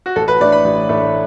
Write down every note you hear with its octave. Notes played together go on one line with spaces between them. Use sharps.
F#4
A1 A4
B4
A2 A3 D4 D5
B5
A1
A2 A3 D4